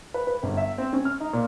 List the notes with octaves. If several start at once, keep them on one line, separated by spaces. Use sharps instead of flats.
B4
B4
G1
E5
C4
C#4
F6
D#4
A#2